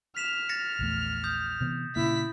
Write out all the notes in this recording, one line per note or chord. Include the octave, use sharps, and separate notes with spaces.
F6 B6 E7 F7
A6 A#6 C#7
A#1 E2 A3
D#6 G6
C3 E3 B3
A#2 C#3 A#3 E4 B6